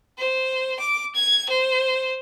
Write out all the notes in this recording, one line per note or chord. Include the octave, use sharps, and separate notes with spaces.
C5
D6
G#6
C5